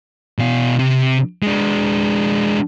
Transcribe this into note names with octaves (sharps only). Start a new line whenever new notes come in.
B2 F5
C3
G#3 D4